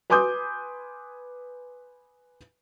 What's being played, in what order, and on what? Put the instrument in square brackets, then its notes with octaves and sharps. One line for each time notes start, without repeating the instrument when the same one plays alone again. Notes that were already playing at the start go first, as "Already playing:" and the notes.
[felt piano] B4 G#5 C6 D6 D#6 G6